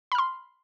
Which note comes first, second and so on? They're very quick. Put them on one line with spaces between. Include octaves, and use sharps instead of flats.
B5 F6 C6